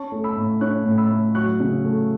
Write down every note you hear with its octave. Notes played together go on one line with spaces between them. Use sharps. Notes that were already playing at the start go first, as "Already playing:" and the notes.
Already playing: C#4 A5 C#6
A3
B5 E6
A2
C#4 C#6 F#6
A2
B5 E6
A2
F#3 C#6 F#6
C#3
A3